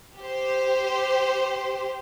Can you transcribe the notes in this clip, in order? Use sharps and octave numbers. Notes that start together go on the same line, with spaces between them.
G4 C5